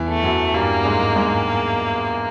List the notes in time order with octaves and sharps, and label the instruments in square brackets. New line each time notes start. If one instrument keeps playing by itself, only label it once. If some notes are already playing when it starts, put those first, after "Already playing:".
Already playing: [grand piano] E2 E3
[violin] A3
[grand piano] F#2 F#3
[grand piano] G2 G3 [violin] A#3
[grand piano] G#2 G#3
G#2 G#3